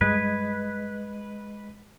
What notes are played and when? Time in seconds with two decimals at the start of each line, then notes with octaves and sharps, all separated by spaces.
0.01 G2 G3 G#3 B4 D#5 G#6